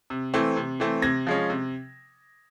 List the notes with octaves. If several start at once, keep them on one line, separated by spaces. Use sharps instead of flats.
C3
E3 A3 C4
C3
E3 A3 C4
C3 G#6 A#6
F3 G#3 C#4
C3